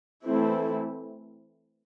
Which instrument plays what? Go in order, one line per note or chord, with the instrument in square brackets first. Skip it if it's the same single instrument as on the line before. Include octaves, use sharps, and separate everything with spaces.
[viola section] E3 A3 C4 E4 A4